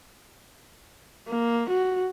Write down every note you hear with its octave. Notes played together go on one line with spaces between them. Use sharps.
A#3
F#4